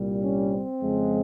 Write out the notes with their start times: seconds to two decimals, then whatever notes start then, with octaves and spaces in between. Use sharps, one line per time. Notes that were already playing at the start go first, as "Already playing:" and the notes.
Already playing: C2 A#2 G3
0.21 C#4
0.51 C4
0.82 F2 C#3 F3 G#3